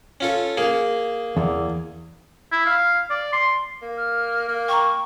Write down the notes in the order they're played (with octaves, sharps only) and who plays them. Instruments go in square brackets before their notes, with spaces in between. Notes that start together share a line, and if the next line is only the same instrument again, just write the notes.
[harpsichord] C#4 F4 A4
A#3 G#4
[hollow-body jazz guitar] E2
[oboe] E4
F5
D5
C6
[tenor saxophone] A#3
[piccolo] F6
[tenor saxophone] A#3
[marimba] G5 A#5 [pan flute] C#6